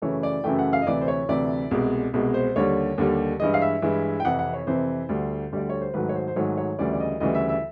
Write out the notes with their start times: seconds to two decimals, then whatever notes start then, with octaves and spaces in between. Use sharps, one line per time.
0.02 F#2 C#3 E3 A3 C#5
0.23 D5
0.44 F#2 C#3 E3 A3 G5
0.59 F#5
0.73 F5
0.82 D#5
0.86 D2 C3 E3 D5
1.01 C5
1.08 C#5
1.28 D2 C3 E3 D5
1.71 C2 B2 G#3
2.14 C2 B2 G#3
2.34 C5
2.56 D#2 D3 G3 C#5
2.98 D#2 D3 G3
3.40 G2 E3 G#3 D#5
3.54 F5
3.62 E5
3.82 G2 E3 G#3
4.20 G5
4.25 F2 C3 E3 F#5
4.39 F#5
4.53 C#5
4.67 F2 C3 E3 C5
5.09 D2 D3 G3
5.52 D2 D3 G3 D5
5.70 C#5
5.81 C5
5.94 G#2 D#3 F#3 A3 B4
6.09 C#5
6.15 C5
6.28 C5
6.36 G#2 D#3 F#3 A3 C#5
6.57 C#5
6.79 D2 C#3 E3 G3 D5
6.93 D5
7.00 D#5
7.20 D2 C#3 E3 G3 D#5
7.35 E5
7.49 E5